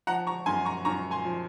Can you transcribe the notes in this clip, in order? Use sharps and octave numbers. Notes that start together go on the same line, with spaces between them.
F3 F#5 A#5
A#5 C#6
F#2 G#5 C6
A#5 C#6
F#2 A#5 C#6
G#5 C6
F3